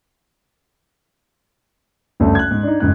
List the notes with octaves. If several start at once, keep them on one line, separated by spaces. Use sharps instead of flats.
F#1 D2 G2 D3 A3 C#4
F#6 G#6
G#2
D4 D#4
F#1 G#2 F#6